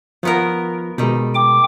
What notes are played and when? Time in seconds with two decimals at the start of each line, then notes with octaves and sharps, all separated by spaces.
0.23 D#3 F3 B3 F4 A#4
0.98 B2 D#3 G3 G#3
1.35 G5 D6